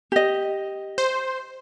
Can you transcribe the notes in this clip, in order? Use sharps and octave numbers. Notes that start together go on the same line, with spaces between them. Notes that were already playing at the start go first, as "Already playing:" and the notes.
G4 D#5
C5